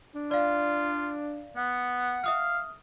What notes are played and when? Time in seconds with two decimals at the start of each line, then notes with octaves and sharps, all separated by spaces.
0.15 D4
0.31 F4 D5 F5
1.57 B3 F#5
2.24 E5 F5 D#6 F6